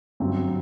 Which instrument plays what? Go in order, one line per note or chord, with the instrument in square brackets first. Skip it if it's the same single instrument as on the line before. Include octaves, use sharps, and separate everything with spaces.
[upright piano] G1 G2 F#3 C4